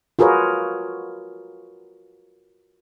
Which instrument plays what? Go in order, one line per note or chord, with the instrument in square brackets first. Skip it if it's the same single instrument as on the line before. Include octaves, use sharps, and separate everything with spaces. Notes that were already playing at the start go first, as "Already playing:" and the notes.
[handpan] F4 F#4 G#4 A#4 B4 C#5